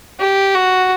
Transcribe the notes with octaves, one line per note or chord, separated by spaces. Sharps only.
G4
F#4